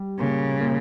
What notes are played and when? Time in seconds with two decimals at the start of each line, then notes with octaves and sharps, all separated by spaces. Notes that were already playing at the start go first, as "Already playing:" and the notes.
Already playing: G3
0.19 A#2 C#3
0.60 A#2